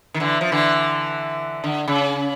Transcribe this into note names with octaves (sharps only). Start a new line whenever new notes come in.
D#3
D3 E3
F3
D3 E3
D3
C#3